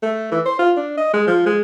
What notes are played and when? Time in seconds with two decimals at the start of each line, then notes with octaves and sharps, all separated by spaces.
0.03 A3
0.31 E3
0.46 C5
0.59 F4
0.77 D4
0.98 D#5
1.13 G#3
1.27 F3
1.46 G#3